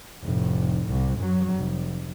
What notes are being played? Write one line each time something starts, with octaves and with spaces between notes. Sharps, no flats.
F1 A2
C2
F#2 F#3
F1